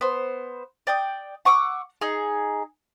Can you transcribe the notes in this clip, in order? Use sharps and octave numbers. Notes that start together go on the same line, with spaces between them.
B3 C5
D5 G5 D#6
F#5 C#6 D6 E6
D#4 G#4